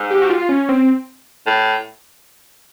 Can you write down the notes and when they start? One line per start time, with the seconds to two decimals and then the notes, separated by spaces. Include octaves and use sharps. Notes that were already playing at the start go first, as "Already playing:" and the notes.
Already playing: G#2
0.10 G4
0.22 F#4
0.30 F4
0.49 C#4
0.69 C4
1.46 A2